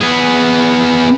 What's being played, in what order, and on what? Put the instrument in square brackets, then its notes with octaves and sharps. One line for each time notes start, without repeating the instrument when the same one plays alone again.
[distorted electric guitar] B3 G#4